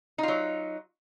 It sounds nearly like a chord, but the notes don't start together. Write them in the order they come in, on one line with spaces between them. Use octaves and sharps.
D#4 F4 F#3